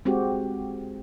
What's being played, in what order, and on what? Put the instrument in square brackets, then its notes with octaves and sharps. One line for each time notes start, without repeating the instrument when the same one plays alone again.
[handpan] G#3 C4 F#4 G4